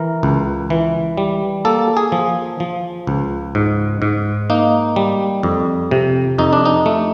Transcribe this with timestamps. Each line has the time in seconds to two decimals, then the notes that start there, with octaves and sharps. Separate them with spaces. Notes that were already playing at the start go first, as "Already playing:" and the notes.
Already playing: E3 A#4
0.23 C#2
0.70 E3
1.18 G3
1.65 A#3 A4
1.97 G#4
2.12 F3
2.60 F3
3.07 C#2
3.55 G#2
4.02 G#2
4.50 A#3 D#4
4.96 G3
5.43 F2
5.91 C3
6.38 F2 D#4
6.53 D4
6.65 D#4
6.86 A3